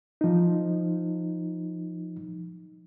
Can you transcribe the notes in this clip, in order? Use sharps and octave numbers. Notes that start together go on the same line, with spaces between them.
F3 D#4